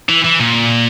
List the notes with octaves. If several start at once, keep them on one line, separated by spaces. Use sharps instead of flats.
E3
E3
A#2